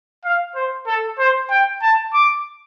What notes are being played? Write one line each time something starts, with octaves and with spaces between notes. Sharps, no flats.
F5
C5
A4
C5
G5
A5
D6